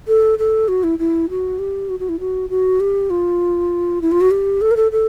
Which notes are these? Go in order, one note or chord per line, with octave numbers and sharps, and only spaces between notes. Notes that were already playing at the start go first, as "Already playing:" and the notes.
A4
A4
F#4
E4
E4
F#4
G4
F#4
F#4
E4
F#4
F#4
G4
F4
E4
F4
F#4
G4
A4
A#4
A4
A4